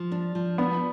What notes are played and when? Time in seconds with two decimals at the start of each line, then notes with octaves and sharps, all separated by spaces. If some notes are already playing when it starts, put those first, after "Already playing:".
Already playing: F3
0.12 D4
0.35 F3
0.58 B3 D4